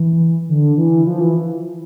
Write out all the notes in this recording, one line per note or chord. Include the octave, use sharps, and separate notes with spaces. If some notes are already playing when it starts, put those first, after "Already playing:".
Already playing: E3
D3
E3
F3
E3